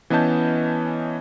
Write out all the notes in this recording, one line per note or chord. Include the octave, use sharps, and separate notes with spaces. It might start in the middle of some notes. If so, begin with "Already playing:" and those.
E3 B3 C#4 D#5 A5 G6